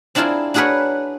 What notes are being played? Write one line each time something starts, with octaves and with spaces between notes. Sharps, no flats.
C4 D4 E4 F4 G#4 A#4
D4 F#4 G#4 A#4 B4 C#5